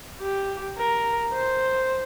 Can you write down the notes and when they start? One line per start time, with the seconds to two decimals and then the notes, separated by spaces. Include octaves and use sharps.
0.21 G4
0.78 A#4
1.33 C5